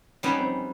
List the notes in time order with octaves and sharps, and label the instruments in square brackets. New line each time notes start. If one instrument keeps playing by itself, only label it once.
[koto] G3 B3 D#4 G#4 [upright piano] C#4
[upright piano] C4